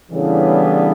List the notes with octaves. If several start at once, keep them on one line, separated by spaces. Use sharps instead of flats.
A2 C#3 E3 G3 B3 D4